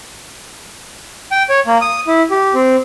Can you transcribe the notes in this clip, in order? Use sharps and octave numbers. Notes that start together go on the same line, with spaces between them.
G5
C#5
A#3
D#6
E4
G4
C4